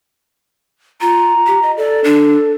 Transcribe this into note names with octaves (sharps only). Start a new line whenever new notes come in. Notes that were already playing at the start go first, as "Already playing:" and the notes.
F4 A#5
G4
D#5
A4 D5
D4